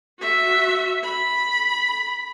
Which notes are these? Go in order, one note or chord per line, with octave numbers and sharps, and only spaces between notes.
F#4 E5
B5